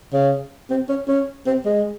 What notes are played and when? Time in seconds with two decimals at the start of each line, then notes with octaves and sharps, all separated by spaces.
0.13 C#3
0.70 C4
0.89 C#4
1.08 C#4
1.46 C4
1.65 G#3